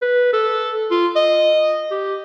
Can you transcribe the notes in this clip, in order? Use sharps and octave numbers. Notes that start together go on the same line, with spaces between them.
B4
A4
F4
D#5
G4